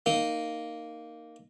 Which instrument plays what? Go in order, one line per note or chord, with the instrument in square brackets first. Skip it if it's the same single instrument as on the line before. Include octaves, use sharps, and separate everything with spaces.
[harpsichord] A#3 D#4